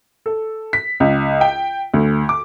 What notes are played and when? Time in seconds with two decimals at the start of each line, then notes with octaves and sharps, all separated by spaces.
0.26 A4
0.73 B6
1.00 C#2
1.41 G5
1.94 D2
2.29 D6